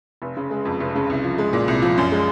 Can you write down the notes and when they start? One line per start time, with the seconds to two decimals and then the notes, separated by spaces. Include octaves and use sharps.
0.22 F1
0.37 C#3
0.51 G#3
0.65 F2
0.80 F1
0.95 C#3
1.10 C2
1.24 F3
1.38 G#3
1.53 A#2
1.68 C2
1.82 F3
1.97 F#2
2.12 G#3